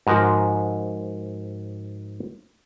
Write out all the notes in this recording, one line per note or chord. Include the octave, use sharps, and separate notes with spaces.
G#2 F3 F#4 A#4